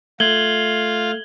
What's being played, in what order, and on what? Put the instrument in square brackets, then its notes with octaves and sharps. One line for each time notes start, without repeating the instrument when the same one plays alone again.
[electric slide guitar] A3 [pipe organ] F4 F5 [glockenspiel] G#6 F#7 G7